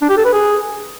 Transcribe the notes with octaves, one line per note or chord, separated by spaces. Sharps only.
D4
G4
A4
B4
G#4